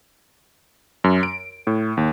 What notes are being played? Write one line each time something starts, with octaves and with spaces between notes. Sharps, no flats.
F#2
D7
A2
D#2